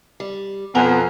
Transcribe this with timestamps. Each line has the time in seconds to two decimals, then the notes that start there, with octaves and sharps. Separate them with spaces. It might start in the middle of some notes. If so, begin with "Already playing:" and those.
0.20 G3
0.75 F2 B2 B3 C4 F#5 G#5 A#5